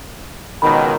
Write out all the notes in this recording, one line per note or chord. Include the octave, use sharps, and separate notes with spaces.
C#2 B2 D#3 B5